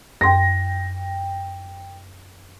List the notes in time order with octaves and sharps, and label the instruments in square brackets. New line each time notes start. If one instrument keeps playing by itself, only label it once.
[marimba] F#2 C6 [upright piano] G5 A#6